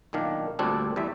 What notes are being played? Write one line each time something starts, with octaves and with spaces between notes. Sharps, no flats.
B1 A#2 D#3 D4 F5
D2 A#2 G3 C4 D4 A4
E2 G3 E5